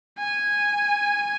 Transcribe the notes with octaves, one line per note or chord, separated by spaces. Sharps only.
G#5